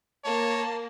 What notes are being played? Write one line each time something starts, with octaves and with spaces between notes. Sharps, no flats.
A#3 C#5 A5